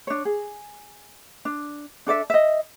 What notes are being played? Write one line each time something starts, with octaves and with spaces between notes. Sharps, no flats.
D4 C#5
G#4
D4
D4 A4 D5 E5
D#5 E5